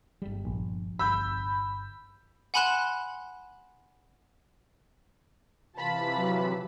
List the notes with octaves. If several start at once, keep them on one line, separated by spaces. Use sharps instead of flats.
G1 G3
A#1
G1 B5 E6 G6
F#5 G#5 B5 C6 F#6 E7
C3 E3 F4 A5 B5
F#3